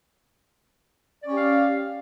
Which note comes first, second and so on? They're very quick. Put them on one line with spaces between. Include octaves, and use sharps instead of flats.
D5 C#4 G4 F5